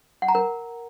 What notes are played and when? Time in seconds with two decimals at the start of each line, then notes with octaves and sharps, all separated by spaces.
0.22 F#5
0.28 A#5
0.35 A#4